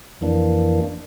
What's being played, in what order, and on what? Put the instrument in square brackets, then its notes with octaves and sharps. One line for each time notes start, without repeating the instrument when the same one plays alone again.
[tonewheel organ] F2 E3 A#3 D4